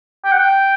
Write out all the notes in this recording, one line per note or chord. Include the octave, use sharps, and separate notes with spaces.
G5
F#5
G5